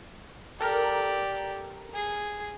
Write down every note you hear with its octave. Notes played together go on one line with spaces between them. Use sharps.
G4 A4 A#4 D5 A#5
G#4